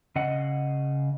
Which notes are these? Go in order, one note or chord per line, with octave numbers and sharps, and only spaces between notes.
C#3 D#5 F#5